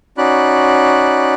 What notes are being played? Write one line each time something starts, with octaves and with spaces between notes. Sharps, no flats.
C#4 D#4 F#4 D5 B5 F#6